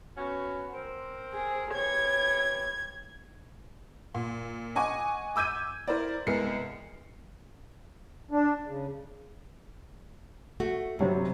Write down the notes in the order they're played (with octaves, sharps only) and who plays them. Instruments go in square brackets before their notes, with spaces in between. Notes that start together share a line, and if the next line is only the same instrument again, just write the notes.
[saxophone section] B3 C#4 F#4
C4 A#4 C5
[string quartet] G#4
[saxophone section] E3 G4 C#5 [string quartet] G#6
[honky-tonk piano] A#2
D#5 F#5 G#5 C#6 D6
D6 E6 G6 G#6 D#7
E4 A#4 C5 D5
C2 G#3 B3 A#4 C7 C#7
[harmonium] D4
C#3
[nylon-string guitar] A3 F#4
[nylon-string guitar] G2 [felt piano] C3 F#3 G3